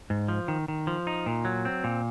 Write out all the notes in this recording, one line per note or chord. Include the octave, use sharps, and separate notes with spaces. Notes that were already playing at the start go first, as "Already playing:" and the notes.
G#2
F3
D#3
D#3
F3
D#4
A#2
F#3
C4
A#2